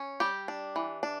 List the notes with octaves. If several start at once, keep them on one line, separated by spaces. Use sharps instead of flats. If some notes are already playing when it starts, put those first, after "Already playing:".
Already playing: C#4
G3 G4
D4
E3
D4